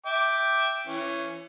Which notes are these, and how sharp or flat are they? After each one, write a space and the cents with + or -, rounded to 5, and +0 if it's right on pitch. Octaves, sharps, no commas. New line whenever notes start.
E5 +0 G5 +0 D6 +0
E3 +30 C#4 +0